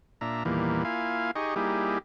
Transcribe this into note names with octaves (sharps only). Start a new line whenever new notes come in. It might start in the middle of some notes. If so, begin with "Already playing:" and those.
A#2 D4 E5 A#5
E2 A#2 D#3 E3 G3 A#3
A#3 E4 F4 F5 G#5
D#4 G4 G#4 D#5 C#6
G3 A#3 D#4 E4 G4 G#4